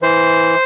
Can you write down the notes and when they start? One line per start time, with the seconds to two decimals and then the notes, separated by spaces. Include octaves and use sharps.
0.02 E3 C5